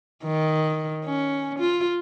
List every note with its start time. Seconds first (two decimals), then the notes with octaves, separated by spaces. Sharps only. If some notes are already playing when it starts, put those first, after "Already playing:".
0.24 D#3
1.05 C#4
1.59 F4